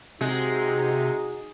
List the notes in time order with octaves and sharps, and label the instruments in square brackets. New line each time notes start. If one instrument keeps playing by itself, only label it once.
[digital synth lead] C3 [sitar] G#3 [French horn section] D#4 F#4